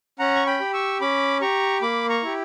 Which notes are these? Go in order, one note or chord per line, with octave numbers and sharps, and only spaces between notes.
C#4 F#5 A#5
C#6
G5 B5
G4
C#6 E6
C#4 B5 D6
G4 A#5 C#6
A#3 B5 D6
A#5 C#6
E4 G4